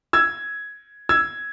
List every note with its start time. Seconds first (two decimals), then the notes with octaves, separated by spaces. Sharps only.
0.13 E6 G#6
1.09 E6 G#6